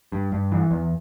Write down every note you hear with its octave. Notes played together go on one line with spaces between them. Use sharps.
G2
G2
E3
E2